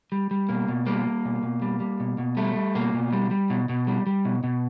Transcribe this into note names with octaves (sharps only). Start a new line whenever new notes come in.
G3
G3
B2 A#3
B2
G3 A#3
G3
B2
B2
G3
G3
B2
B2
G3 A3
G3
B2 A#3
B2
G3
G3
B2
B2
G3
G3
B2
B2